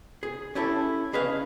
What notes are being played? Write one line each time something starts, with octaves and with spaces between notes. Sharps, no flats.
G#4
C#4 E4 G4 A4 C#5
C#4 G#4 B4 D#5 F5